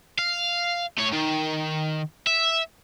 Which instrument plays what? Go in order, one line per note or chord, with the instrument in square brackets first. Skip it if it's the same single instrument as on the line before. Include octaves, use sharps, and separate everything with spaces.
[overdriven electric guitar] F5
A3 C#5
D#3
E5